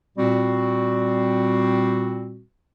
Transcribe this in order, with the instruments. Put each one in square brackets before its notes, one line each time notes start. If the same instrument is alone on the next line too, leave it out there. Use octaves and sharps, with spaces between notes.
[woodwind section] A#2 G3 C4 F#4